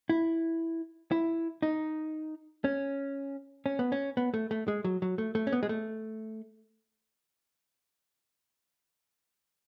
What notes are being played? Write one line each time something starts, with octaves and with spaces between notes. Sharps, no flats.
E4
E4
D#4
C#4
C#4
B3
C#4
B3
A3
A3
G#3
F#3
F#3
A3
A3
C#4
B3
G#3
A3